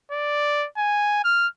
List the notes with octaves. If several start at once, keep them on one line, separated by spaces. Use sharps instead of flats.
D5
G#5
F6